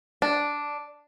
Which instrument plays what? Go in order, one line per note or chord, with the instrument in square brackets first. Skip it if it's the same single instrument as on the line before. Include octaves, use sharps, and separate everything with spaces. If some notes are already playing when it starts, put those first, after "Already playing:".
[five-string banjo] D4